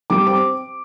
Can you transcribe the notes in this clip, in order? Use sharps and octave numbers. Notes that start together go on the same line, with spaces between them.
G3 D6
C4 D6